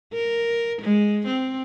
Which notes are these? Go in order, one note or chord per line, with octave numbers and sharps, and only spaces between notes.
A#4
G#3
C4